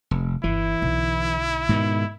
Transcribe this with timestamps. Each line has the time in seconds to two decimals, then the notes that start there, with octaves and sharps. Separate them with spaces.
0.11 F1
0.44 G1 E3 E4
0.82 B1 D3
1.69 G#2 B2 D#3